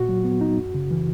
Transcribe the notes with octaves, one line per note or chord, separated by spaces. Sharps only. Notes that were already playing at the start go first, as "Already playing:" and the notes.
Already playing: A#2 F#4
F#3
B3
D#4
F#2
C#3
E3